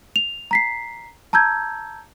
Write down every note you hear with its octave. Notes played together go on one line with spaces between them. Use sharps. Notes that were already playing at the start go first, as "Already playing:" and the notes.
F7
A#5 B6 C7
A5 A#5 E6 G6 G#6